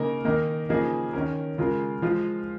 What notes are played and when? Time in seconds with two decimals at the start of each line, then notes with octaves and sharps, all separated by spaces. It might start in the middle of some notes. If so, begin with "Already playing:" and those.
Already playing: C#3 A#3 D#4 A#4
0.25 D#3 A#3 D#4 A#4
0.69 C#3 F3 A#3 D#4 G#4
1.13 D#3 C#4 A#4
1.58 C#3 G#3 F4 A#4
2.02 F3 G#3 F4